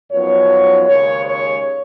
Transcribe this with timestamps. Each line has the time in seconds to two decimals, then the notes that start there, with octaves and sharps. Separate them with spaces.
0.11 F#2 F3 B3 D#4 C#5
0.86 D#2 C#3 G#3 C#5
1.24 C#5